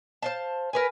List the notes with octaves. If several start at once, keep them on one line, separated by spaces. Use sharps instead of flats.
C5 F5 A5
A#4 B4 G#5